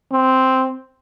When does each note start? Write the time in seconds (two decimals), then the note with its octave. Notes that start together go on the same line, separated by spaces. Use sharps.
0.12 C4